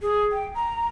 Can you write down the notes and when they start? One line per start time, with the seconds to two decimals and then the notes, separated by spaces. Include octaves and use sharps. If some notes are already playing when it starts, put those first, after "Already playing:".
0.02 G#4
0.32 G5
0.55 A#5